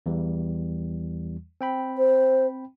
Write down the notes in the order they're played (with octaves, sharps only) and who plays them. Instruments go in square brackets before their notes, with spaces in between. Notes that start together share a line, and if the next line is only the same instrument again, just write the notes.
[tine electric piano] E2 E3 G3
C4 G5 B5
[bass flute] C5